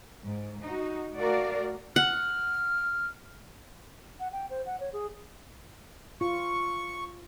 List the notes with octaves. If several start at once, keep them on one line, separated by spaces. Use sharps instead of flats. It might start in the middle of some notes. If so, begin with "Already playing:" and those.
G#2
D#4 F#4
A3 F#4 A#4 D5 F5
F#5 F6
F#5
G5
C5
F#5
C#5
G#4
F4 C#6